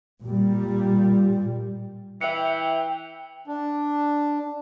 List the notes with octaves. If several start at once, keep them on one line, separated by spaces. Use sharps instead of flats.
A#2 G3
E3 E5 G5 C#7
D4